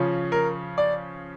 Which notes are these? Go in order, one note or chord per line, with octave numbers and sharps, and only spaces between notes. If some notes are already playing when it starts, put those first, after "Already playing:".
Already playing: C#3 F3 C#4
A#4
D5